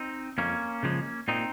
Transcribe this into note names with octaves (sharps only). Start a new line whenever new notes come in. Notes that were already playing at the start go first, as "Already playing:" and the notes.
Already playing: C4 D#4
F2 A#3 C#4
C#3 F3 G#3
A#2 C4 D#4